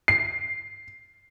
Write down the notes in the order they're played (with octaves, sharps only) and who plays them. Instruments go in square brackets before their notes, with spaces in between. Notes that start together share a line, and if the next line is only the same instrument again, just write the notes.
[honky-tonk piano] C7